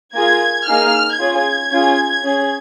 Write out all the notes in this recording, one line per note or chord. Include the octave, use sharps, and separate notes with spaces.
A#3 F4 G#4 G#6
A#3 D#4 G#4 F6
C#4 F4 G#4 G#6
C#4 F4 G#4
C#4 G#4